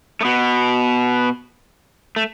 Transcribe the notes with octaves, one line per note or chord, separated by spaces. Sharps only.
A3
B2 B3
A3